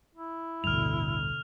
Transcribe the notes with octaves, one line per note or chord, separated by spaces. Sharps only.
E4
A1 D2 G2 B2 D3 F6 F7